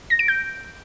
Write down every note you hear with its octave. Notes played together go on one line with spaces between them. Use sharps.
A#6
D7
G6